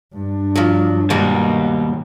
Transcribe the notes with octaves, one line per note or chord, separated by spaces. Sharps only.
G2 D4
F3 F#3
D#2 G#2 B2 G3